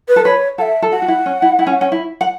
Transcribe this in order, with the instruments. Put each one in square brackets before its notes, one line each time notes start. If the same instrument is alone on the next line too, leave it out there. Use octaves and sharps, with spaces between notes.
[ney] B4
[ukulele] A4
[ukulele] B4 [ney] C#5
[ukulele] A4 [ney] E5 F#5
[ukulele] A4
[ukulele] F#4 [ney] F#5
[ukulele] F#4
E4
C#4
E4
E4
C#4
C#4
E4
F#5